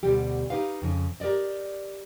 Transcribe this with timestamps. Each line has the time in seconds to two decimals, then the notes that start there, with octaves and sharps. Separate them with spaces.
0.03 D2 B2 G3 G4
0.50 D#4 G4 B4 F5
0.82 F2 C#3
1.20 G4 A#4 B4 D5 D#5